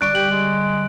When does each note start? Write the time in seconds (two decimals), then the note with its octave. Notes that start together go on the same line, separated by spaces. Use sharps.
0.01 D3 G3 D5 C#6 F#6 D7
0.15 G4 F#7
0.32 G#3